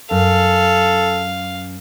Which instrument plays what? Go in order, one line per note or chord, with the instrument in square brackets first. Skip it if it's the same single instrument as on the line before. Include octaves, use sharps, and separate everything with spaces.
[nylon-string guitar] F#2 [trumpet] A4 [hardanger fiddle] F5